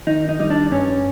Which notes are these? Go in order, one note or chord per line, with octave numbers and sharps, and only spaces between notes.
D#3 D#4
D#4
G3 D#4
D4
G2 C#4